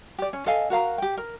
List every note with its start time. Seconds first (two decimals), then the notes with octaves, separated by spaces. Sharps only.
0.18 G4 D5
0.33 C#4
0.46 A4 D#5 F5 G#5
0.70 F#4 A#4 F5 A#5
0.98 G4 G5
1.17 A#4